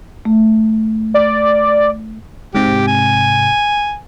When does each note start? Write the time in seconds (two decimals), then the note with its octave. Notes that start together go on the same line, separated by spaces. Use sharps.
0.25 A3
1.14 D5
2.55 G#2 C3 G4
2.87 G#5